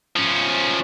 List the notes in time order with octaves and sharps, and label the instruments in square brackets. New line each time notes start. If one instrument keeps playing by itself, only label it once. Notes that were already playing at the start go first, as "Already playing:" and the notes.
[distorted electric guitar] F3 C#4